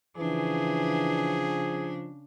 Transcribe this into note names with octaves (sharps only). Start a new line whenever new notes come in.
C#3 E3 F3 D4 G#4